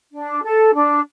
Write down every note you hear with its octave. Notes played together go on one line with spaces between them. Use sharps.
D4
A4
D4